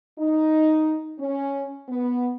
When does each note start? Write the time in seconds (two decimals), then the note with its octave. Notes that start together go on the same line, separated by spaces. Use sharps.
0.19 D#4
1.19 C#4
1.89 B3